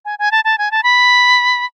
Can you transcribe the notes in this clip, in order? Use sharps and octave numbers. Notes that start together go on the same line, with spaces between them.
G#5
G#5
A5
A5
G#5
A5
B5